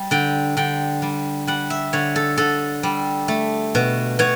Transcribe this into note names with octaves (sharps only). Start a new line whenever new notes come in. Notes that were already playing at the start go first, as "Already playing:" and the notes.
Already playing: G3
D3 G5
D3 G5
G3
G3 F#5
E5
D3 C#5
A4
D3 A4
G3
A3
B2
B2 C#5